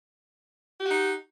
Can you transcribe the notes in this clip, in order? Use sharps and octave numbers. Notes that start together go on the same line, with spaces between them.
D#4 F#4 G4